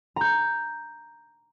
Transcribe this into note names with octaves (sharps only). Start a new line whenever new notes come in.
A#5 G6